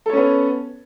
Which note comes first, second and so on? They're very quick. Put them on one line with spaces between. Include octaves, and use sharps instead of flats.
A4 C#5 C#4 B3